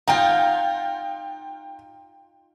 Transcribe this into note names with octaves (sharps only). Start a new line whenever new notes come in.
D#4 F4 F#5 G5